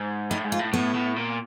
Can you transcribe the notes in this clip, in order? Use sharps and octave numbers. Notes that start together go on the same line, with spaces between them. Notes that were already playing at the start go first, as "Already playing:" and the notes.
Already playing: G#2
A2 D#4
G#2
F4
A2
A2 B3
A2
A#2